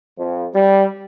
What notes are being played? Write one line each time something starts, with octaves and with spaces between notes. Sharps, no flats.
F2
G3